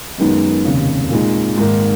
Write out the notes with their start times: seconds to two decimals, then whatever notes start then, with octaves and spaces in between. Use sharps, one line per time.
0.18 F#2 D#3 G#3 B3 D#4
0.65 F1 D#2 C#3
1.11 A#2 G#3 D#4
1.57 G#2 D#3 A#3 D#4